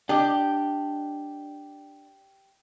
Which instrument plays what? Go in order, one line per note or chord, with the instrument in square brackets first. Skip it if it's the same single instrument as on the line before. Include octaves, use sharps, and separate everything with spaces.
[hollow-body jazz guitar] D4 D#5 [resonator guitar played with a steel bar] G4